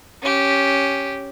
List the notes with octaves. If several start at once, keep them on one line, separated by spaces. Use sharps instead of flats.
C#4 G4